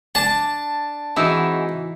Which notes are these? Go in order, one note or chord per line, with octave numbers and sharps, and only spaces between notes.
D4 A5
E3 G#3 C4 D#4 E4 F#4 E6